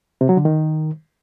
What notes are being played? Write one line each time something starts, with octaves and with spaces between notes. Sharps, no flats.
C3
F#3
D3
D#3